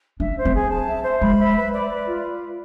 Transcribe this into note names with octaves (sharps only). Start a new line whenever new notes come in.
D4 E5
C5
C4
G#4
A5
E5
C5
G#3 B5
E5
B4
D5
B4
F4